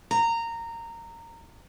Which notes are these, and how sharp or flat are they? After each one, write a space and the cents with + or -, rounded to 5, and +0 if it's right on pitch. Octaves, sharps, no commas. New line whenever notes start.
A#5 -15